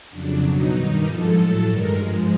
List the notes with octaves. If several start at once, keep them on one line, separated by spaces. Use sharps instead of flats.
F2 C#3 F#3 D4
B2 F#3 D#4
G2 D#3 G3 D#4
G#2 F3 G#3 A4
A2 F#3 A4
G2 D#3 G#3 A#4
G#2 F3 G#3